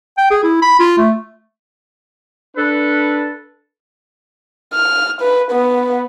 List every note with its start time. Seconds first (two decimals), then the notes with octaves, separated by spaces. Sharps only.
0.17 G5
0.30 G#4
0.43 E4
0.62 B5
0.79 F4
0.98 A3
2.57 D4 A4 B4
4.73 F6
5.21 B4
5.51 B3